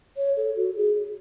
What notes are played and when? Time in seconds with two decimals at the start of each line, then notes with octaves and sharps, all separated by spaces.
0.17 C#5
0.37 A4
0.56 F#4
0.76 G#4